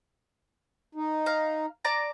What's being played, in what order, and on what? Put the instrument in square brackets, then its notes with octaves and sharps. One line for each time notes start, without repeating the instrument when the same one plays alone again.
[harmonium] D#4
[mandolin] F5 A#5
D5 A5 A#5